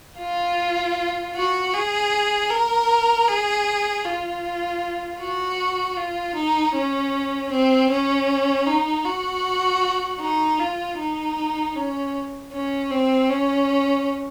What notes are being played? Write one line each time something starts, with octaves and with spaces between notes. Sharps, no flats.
F4
F#4
G#4
A#4
G#4
F4
F#4
F4
D#4
C#4
C4
C#4
D#4
F#4
D#4
F4
D#4
C#4
C#4
C4
C#4